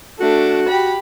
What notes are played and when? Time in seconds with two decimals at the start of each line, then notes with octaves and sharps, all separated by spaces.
0.20 A3 D4 F#4
0.69 G4 B5